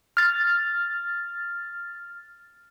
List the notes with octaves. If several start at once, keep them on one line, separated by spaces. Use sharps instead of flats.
F6 A6